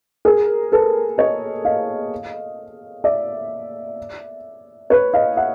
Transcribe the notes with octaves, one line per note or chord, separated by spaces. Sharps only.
G#4 A#4
A4 B4
C#5 D#5
D#5 F5
D5 E5
B4 C#5
D#5 F5
E5 F#5